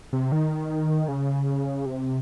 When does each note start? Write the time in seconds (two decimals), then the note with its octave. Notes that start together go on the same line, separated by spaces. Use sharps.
0.13 C3
0.32 D#3
1.08 C#3
1.86 C3